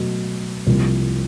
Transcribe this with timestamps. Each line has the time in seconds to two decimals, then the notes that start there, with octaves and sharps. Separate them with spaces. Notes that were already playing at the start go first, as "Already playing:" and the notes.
Already playing: B2 F#3 A3
0.67 C2 C3 F3 A#3